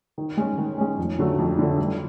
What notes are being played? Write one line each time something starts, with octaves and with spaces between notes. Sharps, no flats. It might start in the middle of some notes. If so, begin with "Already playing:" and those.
D#3
G#3 C#4
D#3
G#3 C#4
F2
D3 F#3 A3
F2
D3 F#3 A3
G2